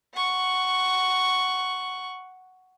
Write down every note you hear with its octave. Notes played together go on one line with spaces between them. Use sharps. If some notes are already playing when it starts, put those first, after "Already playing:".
F#5 C#6